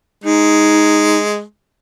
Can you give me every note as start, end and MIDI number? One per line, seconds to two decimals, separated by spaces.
0.24 1.42 56
0.24 1.17 63